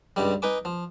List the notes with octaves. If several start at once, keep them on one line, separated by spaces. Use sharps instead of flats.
C#2 G2 G3
D#4 B4 G#5 D6
F3